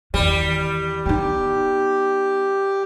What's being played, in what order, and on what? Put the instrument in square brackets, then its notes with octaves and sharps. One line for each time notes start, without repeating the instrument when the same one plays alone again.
[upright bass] E2 D#3 [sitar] G3
[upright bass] B3 D#4 [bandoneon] G4